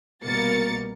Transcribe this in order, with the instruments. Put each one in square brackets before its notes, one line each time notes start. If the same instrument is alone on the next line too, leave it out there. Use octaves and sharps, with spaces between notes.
[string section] C2 B2 A#3 A#4 A6 C#7